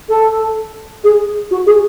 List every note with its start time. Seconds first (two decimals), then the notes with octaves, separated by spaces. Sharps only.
0.09 A4
1.04 G#4
1.51 F#4
1.66 G#4